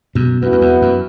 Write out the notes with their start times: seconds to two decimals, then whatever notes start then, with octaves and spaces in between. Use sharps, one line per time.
0.15 F#2 B2
0.42 F#2 E3 B3 F#4
0.52 F#2
0.61 E2
0.82 F#2